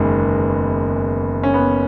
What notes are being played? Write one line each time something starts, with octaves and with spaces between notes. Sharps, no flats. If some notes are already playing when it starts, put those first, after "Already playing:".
Already playing: F#1 E2 D#3 G#3 B3
C#4
B3